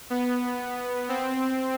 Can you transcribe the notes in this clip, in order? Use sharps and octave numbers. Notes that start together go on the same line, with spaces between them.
B3
C4